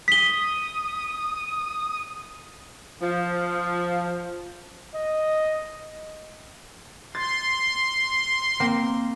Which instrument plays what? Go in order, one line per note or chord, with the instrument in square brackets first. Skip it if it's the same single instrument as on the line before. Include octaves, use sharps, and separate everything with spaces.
[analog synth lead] D#6 [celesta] B6 G7
[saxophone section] F3
[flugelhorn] D#5
[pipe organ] C6 [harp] A6
[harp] A#3 C4